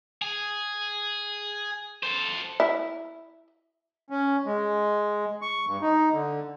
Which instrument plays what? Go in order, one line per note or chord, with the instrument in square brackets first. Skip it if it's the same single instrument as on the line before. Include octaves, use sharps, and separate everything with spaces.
[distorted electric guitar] G#4
A4 C5
[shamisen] E4
[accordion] C#4
G#3
C#6
G2
D#4
D3